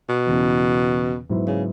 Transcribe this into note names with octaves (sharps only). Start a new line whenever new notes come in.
B2
E2 C#3 E3
G#2 F#3 B3 E4
C#3